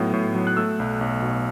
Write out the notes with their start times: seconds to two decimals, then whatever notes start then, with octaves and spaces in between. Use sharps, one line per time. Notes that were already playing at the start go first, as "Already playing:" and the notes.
Already playing: A2 F#3 B3 D#4
0.13 A2
0.35 F#3
0.47 F#6
0.57 A3 E6
0.80 B1
1.01 B1
1.22 B2